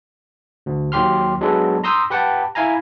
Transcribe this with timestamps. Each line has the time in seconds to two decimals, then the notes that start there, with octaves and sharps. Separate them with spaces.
0.66 D2
0.92 D#2 F#3 G4 C6 F6
1.41 F#3 G#3 B3 D4 A4 B4
1.84 A#5 C6 D#6 E6 G6
2.10 G4 B4 F#5 G5 A5
2.55 E4 F5 G#5 A#5